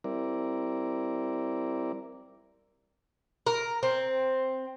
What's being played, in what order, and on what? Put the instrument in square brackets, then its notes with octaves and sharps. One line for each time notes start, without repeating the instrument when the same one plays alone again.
[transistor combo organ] G3 C4 E4 A#4 D5
[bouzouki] A#4
C4